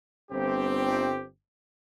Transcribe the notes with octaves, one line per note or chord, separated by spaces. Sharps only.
G1 C4 G4